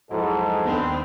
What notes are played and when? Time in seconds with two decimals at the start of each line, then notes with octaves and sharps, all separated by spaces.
0.11 F2 G#2 F#3 E4 A4
0.64 D#2 B3 C4 D4 B4